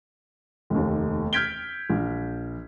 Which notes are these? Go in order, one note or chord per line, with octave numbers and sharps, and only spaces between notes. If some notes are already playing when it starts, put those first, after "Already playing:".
F1 D#2
F6 G6 G#6 B6 D7 G7
A#1